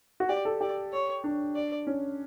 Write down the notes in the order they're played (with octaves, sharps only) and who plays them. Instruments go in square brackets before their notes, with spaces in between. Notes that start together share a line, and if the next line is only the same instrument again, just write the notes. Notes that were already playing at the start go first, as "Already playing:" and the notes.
[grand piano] F#4
[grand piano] G4 [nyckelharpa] D5
[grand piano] A4
[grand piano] G4 [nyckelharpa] D5
[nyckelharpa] C#5
[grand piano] D4
[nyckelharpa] D5
[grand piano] C#4